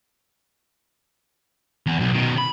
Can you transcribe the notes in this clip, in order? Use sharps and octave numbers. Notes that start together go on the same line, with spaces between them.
E2
B1
B2 D#3
B5